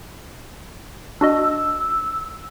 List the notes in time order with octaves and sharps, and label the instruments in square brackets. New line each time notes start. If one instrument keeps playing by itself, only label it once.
[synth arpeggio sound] D4 F#4 D#5 [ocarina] E6